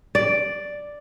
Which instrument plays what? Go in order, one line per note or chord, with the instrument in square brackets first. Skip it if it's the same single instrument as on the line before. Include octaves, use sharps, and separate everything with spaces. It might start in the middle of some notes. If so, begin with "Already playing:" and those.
[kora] D5